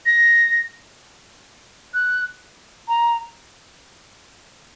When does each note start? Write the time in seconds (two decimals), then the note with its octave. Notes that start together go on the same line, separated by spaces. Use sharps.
0.05 A#6
1.94 F#6
2.88 A#5